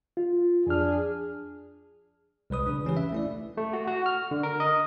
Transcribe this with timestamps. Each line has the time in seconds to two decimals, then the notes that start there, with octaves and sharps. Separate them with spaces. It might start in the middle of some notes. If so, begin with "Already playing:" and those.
0.17 F4
0.67 F2 D4 G#4 F6
2.50 C2 G#3 B4 D#6
2.66 C#3 D4
2.85 E3 C#4 G4 B4
2.97 E5
3.12 A3 E4 D5
3.57 A3
3.73 F#4
3.88 F#4
4.06 F6
4.31 D3
4.43 A#4
4.60 D#5